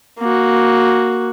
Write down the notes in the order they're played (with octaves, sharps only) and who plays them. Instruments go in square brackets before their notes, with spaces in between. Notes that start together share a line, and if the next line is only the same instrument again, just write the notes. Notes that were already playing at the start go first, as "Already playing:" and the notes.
[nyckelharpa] A#3 F#4